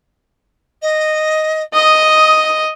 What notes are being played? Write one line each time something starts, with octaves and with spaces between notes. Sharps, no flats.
D#5
D#5 D#6